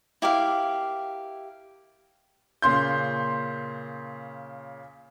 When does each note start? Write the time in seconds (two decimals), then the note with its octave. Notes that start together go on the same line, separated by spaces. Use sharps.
0.22 E4 G4 A#4 F5
2.62 A#2 C#3 C6 G6